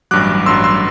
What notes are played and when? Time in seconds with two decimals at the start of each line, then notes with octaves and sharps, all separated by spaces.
0.11 A1 G2 F#3 D6 F#6
0.46 A1 G2 F#3 C6 E6
0.64 C6 E6